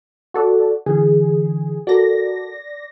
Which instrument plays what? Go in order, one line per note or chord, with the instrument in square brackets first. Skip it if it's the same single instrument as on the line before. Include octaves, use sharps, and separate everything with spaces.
[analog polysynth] F#4 A4 D5
[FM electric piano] D3 E3 [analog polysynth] G#4
[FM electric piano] F#4 A4 A#4 [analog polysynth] D5 A#6